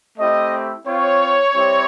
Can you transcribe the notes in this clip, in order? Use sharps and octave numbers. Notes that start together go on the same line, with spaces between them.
A3 C4 E4 G4 D#5
C4 F4 C#5
G3 C4 E4 G4